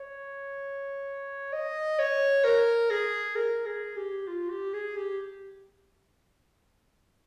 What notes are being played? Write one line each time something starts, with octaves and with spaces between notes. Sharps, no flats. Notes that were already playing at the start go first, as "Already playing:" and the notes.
Already playing: C#5
D#5
C#5
A#4
G#4
A#4
G#4
G4
F4
G4
G#4
G4